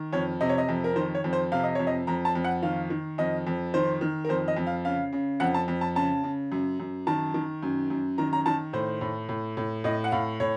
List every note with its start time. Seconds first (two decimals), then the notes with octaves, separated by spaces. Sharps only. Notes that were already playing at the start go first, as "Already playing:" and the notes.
Already playing: D#3
0.13 F2 C#5
0.41 C3 D#5
0.49 C#5
0.58 D#5
0.69 F2
0.84 A#4
0.96 D#3 C5
1.15 C#5
1.24 F2
1.33 C5
1.52 C3 F5
1.64 D#5
1.75 F2 C#5
1.87 D#5
2.07 F2 A#5
2.25 A5
2.35 F2
2.44 F#5
2.62 D#3 F5
2.90 D#3
3.18 F2 D#5
3.47 F2
3.74 D#3 C5
4.01 D#3
4.25 A#4
4.29 F2 C5
4.48 D#5
4.56 F2
4.67 F5
4.85 C#3 F5
5.13 C#3
5.40 F2 F#5
5.54 A5
5.68 F2
5.81 A5
5.96 C#3 A5
6.24 C#3
6.52 F#2
6.80 F#2
7.07 D#3 A5
7.34 D#3
7.63 F#2
7.90 F#2
8.18 D#3 A#5
8.33 A#5
8.46 D#3 A5
8.73 A2 C5
9.01 A2
9.29 A2
9.57 A2
9.84 A2 D#5
10.04 F#5
10.12 A2 F5
10.40 A2 C#5